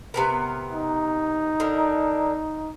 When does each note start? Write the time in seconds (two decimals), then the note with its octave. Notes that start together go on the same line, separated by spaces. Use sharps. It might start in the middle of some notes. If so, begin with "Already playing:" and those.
0.14 C3 B3 A#4
0.72 D#4
1.60 D3 A#4